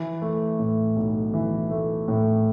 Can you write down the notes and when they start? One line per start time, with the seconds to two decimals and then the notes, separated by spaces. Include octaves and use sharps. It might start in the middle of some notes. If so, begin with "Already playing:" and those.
Already playing: E3
0.22 A3
0.59 A2
0.96 B1
1.34 E3
1.71 A3
2.08 A2